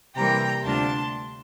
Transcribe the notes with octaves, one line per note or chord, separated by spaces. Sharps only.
C3 E3 G3 A#3 G5 A#5
D2 C3 G3 D4 F4 A5 C6